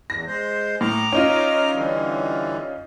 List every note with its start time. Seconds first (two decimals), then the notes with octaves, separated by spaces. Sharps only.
0.10 E2 A#6
0.27 G#3 C5
0.81 A2 A#5 D6 F6
1.12 C#4 D#4 F4
1.74 D3 E3 G3